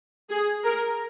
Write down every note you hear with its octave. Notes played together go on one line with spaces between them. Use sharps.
G#4
A#4